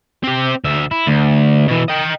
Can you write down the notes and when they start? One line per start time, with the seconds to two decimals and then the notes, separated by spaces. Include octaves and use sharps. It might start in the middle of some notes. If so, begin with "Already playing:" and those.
0.23 C4 G4
0.64 D2 E5
0.91 E4
1.07 D2
1.68 B2 E3
1.89 D#5 G5